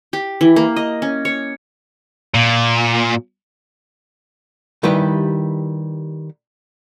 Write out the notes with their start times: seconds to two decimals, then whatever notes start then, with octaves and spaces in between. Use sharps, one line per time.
0.13 G4
0.41 E3
0.56 A#3
0.76 D#5
1.02 C#4
1.25 C#5
2.35 A#2
4.83 D#3 G3 E4 G4 B4